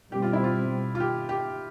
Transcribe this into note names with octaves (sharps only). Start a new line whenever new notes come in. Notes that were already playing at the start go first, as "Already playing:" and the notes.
B2 G3 C4 G4
F4
E4
F4
F4
G4
G4